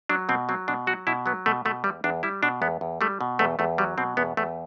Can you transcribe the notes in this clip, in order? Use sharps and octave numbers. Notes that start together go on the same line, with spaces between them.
F#3 D4
B2 C4
F#3 C4
B2 D4
F#3 F#4
B2 E4
F#3 B3
B2 A3
B2 A3
E2 G3
E2 D4
G3 E4
B2 D4
E2 B3
E2
G3 A3
B2
E2 A3
E2 A3
F#3 G3
B2 C4
E2 B3
E2 A3